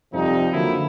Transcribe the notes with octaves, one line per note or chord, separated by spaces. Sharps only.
F2 C3 F3 G3 D#4
D3 F3 F#3 A#3 E4